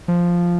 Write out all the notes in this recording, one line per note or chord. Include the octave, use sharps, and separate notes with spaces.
F3